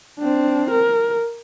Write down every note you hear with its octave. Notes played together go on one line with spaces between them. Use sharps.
C4 D4
A#4